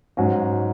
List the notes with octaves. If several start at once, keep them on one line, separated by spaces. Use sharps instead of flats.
G#2 F#3 C#4 F#4